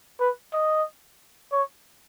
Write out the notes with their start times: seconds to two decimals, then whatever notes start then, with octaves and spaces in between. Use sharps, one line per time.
0.20 B4
0.53 D#5
1.52 C#5